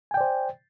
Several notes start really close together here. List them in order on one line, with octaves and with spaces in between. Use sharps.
G#5 G5 D5 C5